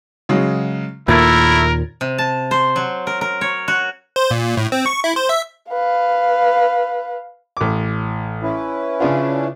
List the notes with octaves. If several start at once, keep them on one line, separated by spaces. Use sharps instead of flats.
C#3 F#3 G#3
D#2 A#2 A3 E4 A#4 G#6 A6
C3
A5
C5
F#3
A#4
A#4
C#5
F#4
C5
A#2
A2
C4
C#6
E4
C5
E5
B4 F5
A1 D6
C#4 E4 B4
C#3 D4 F4